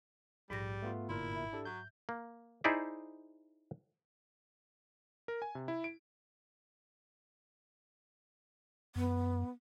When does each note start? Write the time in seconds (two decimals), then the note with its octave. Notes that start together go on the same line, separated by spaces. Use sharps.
0.50 A#1 G#2 G3 A#6
0.82 A3 B3 F4
1.09 G1 A#2 E4 A#4 C6
1.32 E5 B5
1.53 D4 G4 A4
1.65 F#3 G6
2.09 A#3
2.64 D#4 E4 G#4 C5 D5 E5
5.28 A#4
5.42 G#5
5.55 C3
5.68 E4
5.84 D7
8.96 F#2 B3